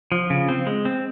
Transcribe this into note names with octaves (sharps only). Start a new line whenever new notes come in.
F3
C#3
C4
G#3
C4